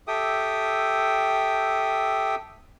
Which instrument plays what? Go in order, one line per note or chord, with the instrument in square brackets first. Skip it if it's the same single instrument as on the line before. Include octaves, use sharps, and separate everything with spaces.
[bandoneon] G4 A4 E5 G5 D#6